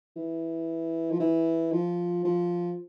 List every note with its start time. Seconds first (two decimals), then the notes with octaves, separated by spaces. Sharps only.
0.16 E3
1.11 F3
1.20 E3
1.72 F3
2.24 F3